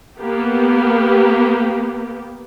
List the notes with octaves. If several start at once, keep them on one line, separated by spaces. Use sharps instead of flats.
A#3 B3 G4